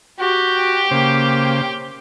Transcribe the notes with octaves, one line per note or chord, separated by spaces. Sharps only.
F#4 G4 G5
C#3 A#3 C5